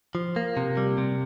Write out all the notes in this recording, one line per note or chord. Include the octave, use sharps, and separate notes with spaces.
F3
A#3
C3
G3
C3